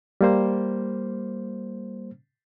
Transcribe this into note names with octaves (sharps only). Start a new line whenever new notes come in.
G3 A#3 C5